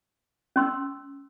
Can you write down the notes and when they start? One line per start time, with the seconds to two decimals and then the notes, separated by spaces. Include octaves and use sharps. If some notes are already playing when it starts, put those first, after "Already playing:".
0.56 C#4 C6 E6